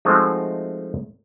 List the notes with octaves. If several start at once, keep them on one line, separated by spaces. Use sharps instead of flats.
F3 G#3 A3 C4 D#4 F#4